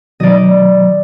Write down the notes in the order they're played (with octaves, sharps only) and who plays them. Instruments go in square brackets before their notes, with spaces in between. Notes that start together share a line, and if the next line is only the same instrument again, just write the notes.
[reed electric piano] B2 D#3 F#3 [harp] D5 D#5